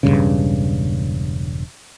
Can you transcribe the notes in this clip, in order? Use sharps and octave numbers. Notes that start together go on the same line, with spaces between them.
E1 A#1 G2 C#3